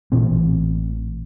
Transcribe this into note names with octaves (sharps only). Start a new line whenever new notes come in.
A1 A#2 E3 C4